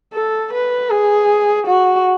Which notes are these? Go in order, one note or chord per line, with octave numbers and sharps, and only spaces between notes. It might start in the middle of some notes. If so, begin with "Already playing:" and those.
A4
B4
G#4
F#4